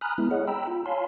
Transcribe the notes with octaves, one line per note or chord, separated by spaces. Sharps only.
G#5 A#5 B5 D#6 F6 F#6
G#3 B3 E4
G#4 C#5 D#5 F#5
G5 A#5 B5 E6
F4
C#5 F5 G#5 A5 B5 C6